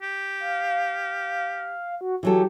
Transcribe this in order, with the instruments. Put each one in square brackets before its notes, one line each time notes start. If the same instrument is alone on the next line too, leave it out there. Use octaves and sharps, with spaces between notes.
[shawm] G4
[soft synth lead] F5
F#4
[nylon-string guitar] E3 F#3 A4 [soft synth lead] G4